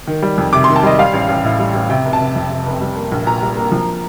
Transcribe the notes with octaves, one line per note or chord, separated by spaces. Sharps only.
D#3
G3
F2
C3 D6
D#3 C6
A5
G3 D#5
G3 F5
A1
A1
A2
G3
A1
C3 G5
F1
A5
F1
F2
C3
F1
G3
A#3
A#1
A#2 A#5
G3
A#3
F3